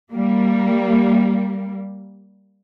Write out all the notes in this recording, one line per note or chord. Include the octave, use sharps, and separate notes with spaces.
G3 A#3